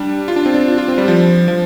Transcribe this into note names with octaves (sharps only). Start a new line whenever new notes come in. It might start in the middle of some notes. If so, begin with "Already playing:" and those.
Already playing: G3 D4
F4
D4
C4
D4
F4
F4
C4
G3
F3
F3